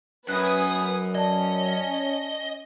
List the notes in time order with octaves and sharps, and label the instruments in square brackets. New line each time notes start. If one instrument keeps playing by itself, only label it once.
[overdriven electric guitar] F#2 [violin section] B4 G#5 D#6 [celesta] F#6
[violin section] C#4 [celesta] D5 A5 [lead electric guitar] D#5